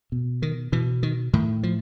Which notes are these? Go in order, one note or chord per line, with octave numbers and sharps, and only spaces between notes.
B2
D#3
B2 E3
D#3
A2 D#3
F3